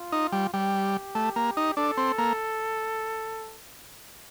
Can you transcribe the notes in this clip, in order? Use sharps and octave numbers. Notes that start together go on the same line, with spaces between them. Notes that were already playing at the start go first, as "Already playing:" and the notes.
Already playing: F4
D#4
G3
G3 G4
A3
A#3
D#4
D4 A4
C4
A#3